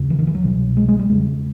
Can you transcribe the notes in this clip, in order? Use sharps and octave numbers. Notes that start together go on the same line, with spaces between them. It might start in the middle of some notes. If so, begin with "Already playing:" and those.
Already playing: D#2 C#3
E3
D#3
E3
F#3
C2 B2
G#3
G#3
G3
E2 C#3 G#3